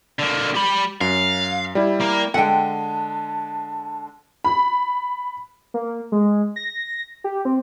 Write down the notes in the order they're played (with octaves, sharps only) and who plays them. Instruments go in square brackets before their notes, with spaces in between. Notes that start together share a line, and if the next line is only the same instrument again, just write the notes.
[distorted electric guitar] D3 A#3
G4 B5
[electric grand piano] F#2 [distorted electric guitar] F5
[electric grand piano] G3 E4
[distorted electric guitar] A#3
[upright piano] D3 G#3 [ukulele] F#5 G5 [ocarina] A5
[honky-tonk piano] B5
[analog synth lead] A#3
G#3
A#6
G4
C4